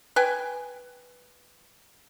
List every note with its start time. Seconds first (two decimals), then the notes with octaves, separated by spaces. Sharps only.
0.16 B4 G5 G#5